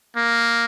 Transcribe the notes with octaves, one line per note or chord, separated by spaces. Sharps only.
A#3